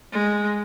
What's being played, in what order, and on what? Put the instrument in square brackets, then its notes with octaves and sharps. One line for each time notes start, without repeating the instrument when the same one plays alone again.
[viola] G#3